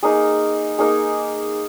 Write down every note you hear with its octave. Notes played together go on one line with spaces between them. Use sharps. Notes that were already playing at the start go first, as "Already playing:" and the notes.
A#3 D#4 G#4
A#3 D#4 G#4